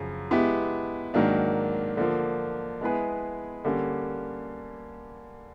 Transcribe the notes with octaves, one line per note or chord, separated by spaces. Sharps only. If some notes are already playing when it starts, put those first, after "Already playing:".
Already playing: F#2 C#3 F3
G#3 B3 E4 G4
G#2 D#3 F#3 A#3 D4
D3 F3 A#3
G#3 B3 E4 G#4 B4
D3 G3 A#3 C#4